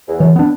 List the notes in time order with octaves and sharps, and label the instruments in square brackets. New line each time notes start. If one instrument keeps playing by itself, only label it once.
[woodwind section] E2
[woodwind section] F#2 [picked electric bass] E3
[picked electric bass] B3 D4